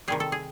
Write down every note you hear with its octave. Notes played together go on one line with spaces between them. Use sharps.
C3 D#3 G3 G#4
A4
G#4